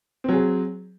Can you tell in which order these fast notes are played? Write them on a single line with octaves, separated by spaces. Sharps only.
C4 F#3 G#4